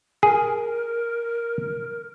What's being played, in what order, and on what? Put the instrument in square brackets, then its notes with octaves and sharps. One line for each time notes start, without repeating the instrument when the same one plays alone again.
[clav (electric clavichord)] G#4 [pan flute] A#4